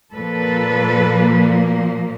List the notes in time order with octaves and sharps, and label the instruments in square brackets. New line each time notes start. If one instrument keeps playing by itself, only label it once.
[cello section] A#2 F3 A#3 A4 B4